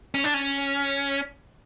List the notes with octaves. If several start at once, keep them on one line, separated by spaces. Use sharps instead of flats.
C#4
D4
C#4